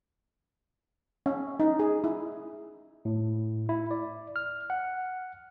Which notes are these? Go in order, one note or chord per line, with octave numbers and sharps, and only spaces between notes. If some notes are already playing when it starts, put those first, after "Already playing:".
C#4
D#4
G#4
E4
A2
E4
D5
F6
F#5